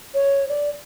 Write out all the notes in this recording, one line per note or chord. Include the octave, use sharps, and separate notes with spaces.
C#5
D5